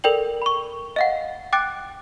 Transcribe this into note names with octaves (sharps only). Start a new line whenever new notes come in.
A4 A#4 D5 G5 F#7
B5 C#6
D#5 F5 F#5
G5 D6 F#6 A6 D7